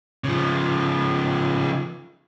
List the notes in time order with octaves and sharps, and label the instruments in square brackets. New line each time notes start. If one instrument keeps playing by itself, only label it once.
[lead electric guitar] C#3 F3